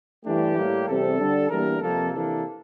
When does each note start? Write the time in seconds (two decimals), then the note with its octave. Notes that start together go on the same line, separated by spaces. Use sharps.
0.25 G2 E3 A3 D4 G4
0.56 A2 G3 A#3
0.87 E2 C3 G3 C4 A4
1.18 D3 G3 D4
1.49 E2 E3 G3 A#3 D4 A#4
1.81 F2 C3 F3 A#3 A4
2.11 C3 E3 A#3 D4 A4